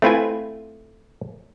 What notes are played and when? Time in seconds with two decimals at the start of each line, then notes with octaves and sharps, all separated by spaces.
0.02 A3 C4 E4 F4 B4 G#5